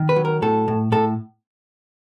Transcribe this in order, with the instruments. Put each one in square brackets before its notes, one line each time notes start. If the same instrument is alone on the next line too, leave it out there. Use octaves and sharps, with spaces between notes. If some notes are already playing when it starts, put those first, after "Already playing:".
Already playing: [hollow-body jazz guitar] D#3
B4
F#3
A#4
A2 A4
A2
A2 A4